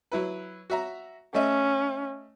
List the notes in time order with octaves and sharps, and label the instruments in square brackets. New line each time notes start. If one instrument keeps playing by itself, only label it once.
[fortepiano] F#3 E4 B4
F#4 E5 A#5
[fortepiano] A3 D#5 E5 [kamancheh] C#4